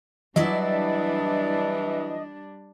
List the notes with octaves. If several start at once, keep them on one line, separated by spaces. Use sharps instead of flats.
E3 F#3 G3 D4 E4 D5 D#5